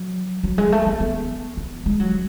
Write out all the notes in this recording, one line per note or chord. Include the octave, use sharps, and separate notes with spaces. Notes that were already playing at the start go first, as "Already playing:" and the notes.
Already playing: F#3
F#3
G#3
A3
B3
B3
B3
G#3
F#3